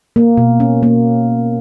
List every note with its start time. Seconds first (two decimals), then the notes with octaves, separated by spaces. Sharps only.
0.16 A#3
0.37 B2
0.60 C#4
0.83 A#3